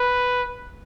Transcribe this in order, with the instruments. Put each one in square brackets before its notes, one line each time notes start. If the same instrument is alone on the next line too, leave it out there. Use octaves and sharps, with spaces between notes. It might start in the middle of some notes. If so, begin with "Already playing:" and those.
Already playing: [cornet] B4